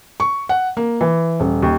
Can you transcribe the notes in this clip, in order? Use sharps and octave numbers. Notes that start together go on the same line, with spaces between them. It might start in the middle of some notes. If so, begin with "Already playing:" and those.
C#6
F#5
A#3
E3
D#1
D#2